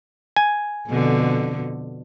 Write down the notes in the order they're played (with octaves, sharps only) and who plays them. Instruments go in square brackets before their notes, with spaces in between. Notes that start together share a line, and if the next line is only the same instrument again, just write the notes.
[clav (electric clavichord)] G#5
[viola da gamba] F2 B2 D3